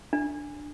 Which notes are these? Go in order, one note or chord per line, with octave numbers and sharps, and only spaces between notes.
D4